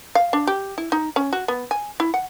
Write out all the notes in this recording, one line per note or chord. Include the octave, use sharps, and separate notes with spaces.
F5
D4
G4
E4
D#4
C#4
F#4
B3
G#5
E4
F#5